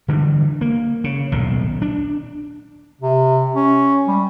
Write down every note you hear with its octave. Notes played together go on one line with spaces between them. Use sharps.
D3 E3 G3
A#3
C#3
D#1 B1 A2
D4
C3
C#4
G3